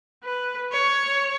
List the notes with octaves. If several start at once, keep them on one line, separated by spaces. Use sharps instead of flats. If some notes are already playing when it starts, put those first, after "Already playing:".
B4
C#5